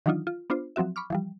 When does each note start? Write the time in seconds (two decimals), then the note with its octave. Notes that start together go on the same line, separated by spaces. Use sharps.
0.06 D#3 E3 F#3 D4 D#4 F4
0.27 F4
0.50 B3 D4 F4 C5
0.76 F3 F#3 C4 F#4 E5
0.96 B5 C#6 D6 F6
1.10 E3 F3 G3